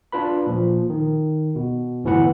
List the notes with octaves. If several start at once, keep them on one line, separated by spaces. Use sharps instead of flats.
D4 F4 B4 B5
A#2 F3
D#3
B2
G1 A2 E3 B4 F#5